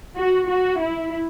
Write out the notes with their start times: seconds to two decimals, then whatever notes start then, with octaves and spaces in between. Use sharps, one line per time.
0.17 F#4
0.49 F#4
0.81 E4